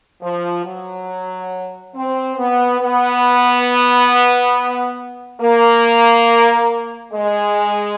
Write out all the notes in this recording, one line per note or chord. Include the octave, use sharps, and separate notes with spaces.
F3
F#3
C4
B3
B3
A#3
G#3